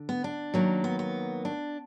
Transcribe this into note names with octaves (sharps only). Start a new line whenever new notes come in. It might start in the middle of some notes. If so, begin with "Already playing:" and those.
Already playing: D3
B3
D4
D#3 F#3 A#3
B3
B3
D4